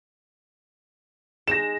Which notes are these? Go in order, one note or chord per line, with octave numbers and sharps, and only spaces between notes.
G#3 D#4 A#6 E7